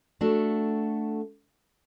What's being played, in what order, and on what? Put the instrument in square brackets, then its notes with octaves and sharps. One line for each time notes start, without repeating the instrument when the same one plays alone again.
[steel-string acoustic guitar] A3 D4 F#4 A4